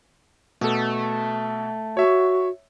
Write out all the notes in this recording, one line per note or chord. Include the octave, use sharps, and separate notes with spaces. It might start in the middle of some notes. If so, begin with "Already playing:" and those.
B2 A3 A4
F#4 C#5 E5